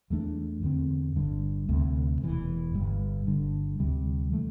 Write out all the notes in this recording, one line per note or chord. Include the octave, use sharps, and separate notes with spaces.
E2 E3 A3 D4
E2 D3 C4
G1 G2 D3
D2 C3 A3
E1 E2 E3
G1 G2 G3
G1 G2 D3
D2 C3 G3
E3 A3